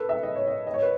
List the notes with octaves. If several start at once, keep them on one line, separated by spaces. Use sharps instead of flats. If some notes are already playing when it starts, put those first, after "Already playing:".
Already playing: A4 B4
E5
D#5
C#5
D#5
D#5
C#5
B4